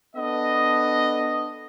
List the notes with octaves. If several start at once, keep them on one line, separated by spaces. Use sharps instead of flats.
B3 D4 A4 D#5